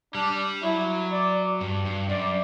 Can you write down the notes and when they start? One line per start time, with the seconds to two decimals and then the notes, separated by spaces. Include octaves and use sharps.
0.15 G3 D4
0.63 F#3 E4
1.12 D5
1.61 G2
1.85 G2
2.09 F#2 D5